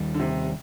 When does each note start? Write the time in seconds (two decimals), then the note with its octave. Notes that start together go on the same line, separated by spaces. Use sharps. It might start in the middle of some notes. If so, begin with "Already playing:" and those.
Already playing: D#2 D#3 G3
0.14 D3
0.20 C3